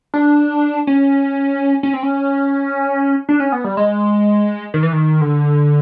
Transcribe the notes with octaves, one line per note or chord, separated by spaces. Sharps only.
D4
C#4
C#4
C4
C#4
D4
C#4
B3
G3
G#3
D#3
E3
D#3
D3